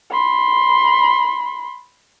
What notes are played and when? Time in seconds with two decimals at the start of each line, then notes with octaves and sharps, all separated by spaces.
0.11 B5 C6